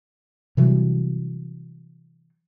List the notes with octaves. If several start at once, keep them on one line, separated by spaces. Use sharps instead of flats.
C3 E3 F#3 G3